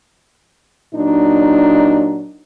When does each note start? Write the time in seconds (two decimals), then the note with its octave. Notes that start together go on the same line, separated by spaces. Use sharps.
0.94 A#2 F#3 D4 D#4